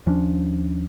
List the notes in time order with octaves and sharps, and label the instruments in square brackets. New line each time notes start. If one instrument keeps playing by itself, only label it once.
[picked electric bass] D#2 F3 C#4 D4